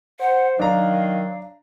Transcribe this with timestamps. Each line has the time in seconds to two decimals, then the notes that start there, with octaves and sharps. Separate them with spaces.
0.20 C5 F#5
0.59 D#3 F#3 D4 F5 A#5